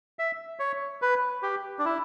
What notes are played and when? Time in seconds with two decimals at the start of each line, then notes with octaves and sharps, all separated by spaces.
0.19 E5
0.60 C#5
1.02 B4
1.43 G4
1.79 D4
1.85 E4